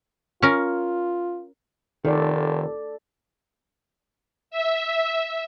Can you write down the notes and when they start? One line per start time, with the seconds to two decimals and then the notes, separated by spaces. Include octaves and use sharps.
0.42 C#4 F4 A#4
2.05 F1 D#3 A4 D5
4.51 E5